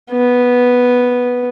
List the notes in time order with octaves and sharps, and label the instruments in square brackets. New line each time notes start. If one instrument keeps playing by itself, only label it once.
[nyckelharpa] B3